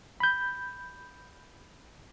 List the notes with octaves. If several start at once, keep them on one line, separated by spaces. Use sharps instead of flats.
B5 G6